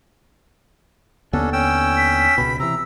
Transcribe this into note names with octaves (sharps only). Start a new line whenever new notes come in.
D#2 D3 B3 C#4 D4 A4
C#4 G5 E6
B6
C#2 B2 B5
C3 E3 A#5 E6